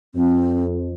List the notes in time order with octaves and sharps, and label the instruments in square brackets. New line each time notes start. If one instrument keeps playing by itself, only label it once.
[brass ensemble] F2 [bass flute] C4